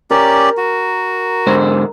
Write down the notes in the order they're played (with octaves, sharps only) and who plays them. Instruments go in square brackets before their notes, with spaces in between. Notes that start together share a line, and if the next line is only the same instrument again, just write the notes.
[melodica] C#4 G4 D5 [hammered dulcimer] A#4
[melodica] F#4
[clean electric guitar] G#2 D3 C5